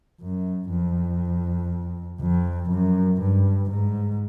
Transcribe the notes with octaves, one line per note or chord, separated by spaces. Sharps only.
F#2
F2
F2
F#2
G2
G#2